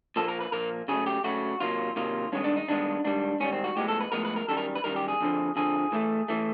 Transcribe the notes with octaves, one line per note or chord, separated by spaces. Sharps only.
A#2 F3 A#3 A4
A#4
B4
A#2 F3 A#3 A#4
C#3 F#3 A3 G#4
G4
C#3 F#3 A3 F#4
C3 D#3 F#3 A#3 F4
C3 D#3 F#3 A#3 F4
G2 D#3 G#3 B3 C#4
D4
D#4
G2 D#3 G#3 B3 D4
G#2 D#3 G3 D4
G#2 D#3 G3 C#4
C4
F#4
A2 F3 G#3 B3 G4
A4
B4
A2 F3 G#3 B3 A#4
B4
A#4
F#2 D#3 G3 A4
A#4
B4
F#2 D#3 G3 A#4
G4
G#4
F2 D3 F3
F2 D3 F3 G#4
A2 E3 A3
A2 E3 A3